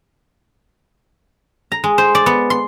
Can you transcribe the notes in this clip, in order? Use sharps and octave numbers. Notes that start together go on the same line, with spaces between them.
A#5
G#3
C5
D5
B3
C6